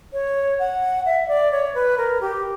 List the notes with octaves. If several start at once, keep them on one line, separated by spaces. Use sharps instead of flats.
C#5
F#5
E5
D5
C#5
B4
A#4
G4